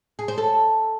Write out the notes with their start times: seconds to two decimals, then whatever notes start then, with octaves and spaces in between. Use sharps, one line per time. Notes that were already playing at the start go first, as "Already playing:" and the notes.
0.19 G#4
0.28 C5
0.38 A4